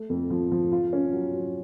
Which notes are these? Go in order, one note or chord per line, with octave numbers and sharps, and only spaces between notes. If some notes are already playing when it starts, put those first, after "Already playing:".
Already playing: A3
F2
F3
F3
F4
C#4
F#3
F#3